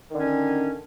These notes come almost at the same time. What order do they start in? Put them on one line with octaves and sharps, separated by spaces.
D#3 D3 C#4